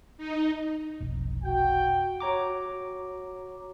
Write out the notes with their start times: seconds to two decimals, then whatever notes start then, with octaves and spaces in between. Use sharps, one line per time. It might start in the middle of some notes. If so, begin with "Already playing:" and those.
0.18 D#4
1.00 F1 B1
1.44 F#4 G5
2.20 F#4 C#5 A#5 D6